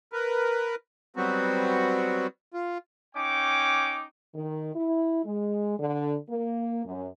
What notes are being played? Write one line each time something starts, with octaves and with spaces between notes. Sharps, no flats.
A#4 B4
F#3 G3 B3 C4 F#4
F4
C#4 D#4 G5 D6
D#3
E4
G#3
D3
A#3
F#2